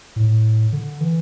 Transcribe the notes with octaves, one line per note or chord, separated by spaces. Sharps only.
A2
D3
E3